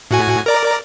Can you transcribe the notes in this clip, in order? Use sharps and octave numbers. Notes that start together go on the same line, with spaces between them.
A2 F#4 G#5
A#4 D5 A#5